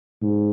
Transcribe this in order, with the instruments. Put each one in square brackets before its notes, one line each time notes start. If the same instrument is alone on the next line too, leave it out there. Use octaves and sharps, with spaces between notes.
[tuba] G#2